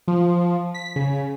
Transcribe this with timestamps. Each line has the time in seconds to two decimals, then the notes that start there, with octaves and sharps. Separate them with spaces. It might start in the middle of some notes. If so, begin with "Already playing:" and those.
0.08 F3
0.74 B6
0.96 C#3